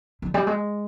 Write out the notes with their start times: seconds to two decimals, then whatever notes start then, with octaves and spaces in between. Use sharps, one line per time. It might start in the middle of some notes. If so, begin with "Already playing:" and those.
0.22 D3
0.34 G3
0.47 G#3